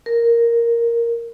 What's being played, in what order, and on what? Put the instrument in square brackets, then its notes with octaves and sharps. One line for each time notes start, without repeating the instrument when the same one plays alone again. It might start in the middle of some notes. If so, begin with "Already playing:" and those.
[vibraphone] A#4